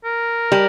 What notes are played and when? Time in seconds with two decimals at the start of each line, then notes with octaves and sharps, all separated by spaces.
0.05 A#4
0.52 G3